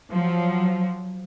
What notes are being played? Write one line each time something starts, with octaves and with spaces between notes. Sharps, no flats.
F3 F#3